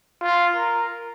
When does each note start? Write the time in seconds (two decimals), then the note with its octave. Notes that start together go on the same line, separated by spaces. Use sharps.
0.22 F4
0.56 A#4